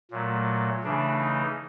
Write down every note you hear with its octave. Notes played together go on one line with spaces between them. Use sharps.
A#2 F#3 A3
C#3 E3 A3 D4
D#4